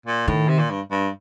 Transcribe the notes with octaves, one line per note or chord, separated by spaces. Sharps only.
A#2
A2 D#3
C3
A#2
G2
G2